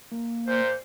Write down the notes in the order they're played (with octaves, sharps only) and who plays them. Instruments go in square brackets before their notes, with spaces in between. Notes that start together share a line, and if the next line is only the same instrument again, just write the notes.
[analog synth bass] A#3
[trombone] A#2 [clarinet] C5